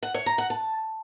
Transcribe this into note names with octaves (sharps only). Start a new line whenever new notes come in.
F#5
C#5
A#5
F#5
A5